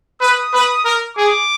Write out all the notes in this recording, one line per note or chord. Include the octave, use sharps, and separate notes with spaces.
B4 D#6
B4
A#4
G#4 D6